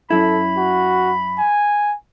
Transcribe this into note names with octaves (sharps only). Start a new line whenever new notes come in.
F#2 E4 A4 B5
F#4
G#5